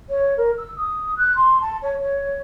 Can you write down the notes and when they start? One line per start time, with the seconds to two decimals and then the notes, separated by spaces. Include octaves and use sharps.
0.09 C#5
0.37 A#4
0.58 E6
0.76 D#6
1.17 F#6
1.36 C6
1.61 A5
1.82 C#5
2.01 C#5